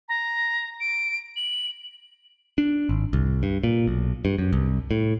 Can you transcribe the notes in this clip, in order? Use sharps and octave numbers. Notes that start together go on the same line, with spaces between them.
A#5
D7
F#7
D4
G#1
C2
G2
A#2
B1
G2
F#2
C2
A2